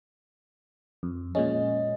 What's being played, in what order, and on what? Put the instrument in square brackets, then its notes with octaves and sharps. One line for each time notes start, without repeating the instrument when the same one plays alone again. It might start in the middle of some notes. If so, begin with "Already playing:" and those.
[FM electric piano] F2
[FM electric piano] A#2 G#3 C#4 [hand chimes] D#5